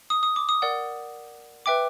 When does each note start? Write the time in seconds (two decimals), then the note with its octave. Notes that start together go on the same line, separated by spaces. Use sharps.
0.10 D#6
0.23 D#6
0.36 D6
0.49 D#6
0.62 A#4 D5 F#5
1.66 B4 E5 G5 D6